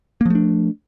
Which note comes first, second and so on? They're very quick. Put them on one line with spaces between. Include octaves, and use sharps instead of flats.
A#3 F3 A3 D4